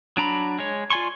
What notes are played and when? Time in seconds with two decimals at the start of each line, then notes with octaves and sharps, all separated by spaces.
0.17 F#3 D4 A#5 B5
0.59 G#3 C#5
0.90 F4 D5 G#5 C6 C#6